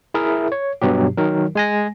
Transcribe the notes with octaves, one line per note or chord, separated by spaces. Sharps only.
E4 G#4 A#4 E5
C#5
G2 B2 F#3 G4
D#3 F#3 A#4
G#3 G#5 A#6